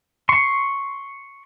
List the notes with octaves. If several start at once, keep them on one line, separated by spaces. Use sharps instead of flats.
C6 C#6